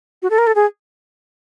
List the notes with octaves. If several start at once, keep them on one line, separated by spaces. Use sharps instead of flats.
F#4
A4
A#4
A4
G#4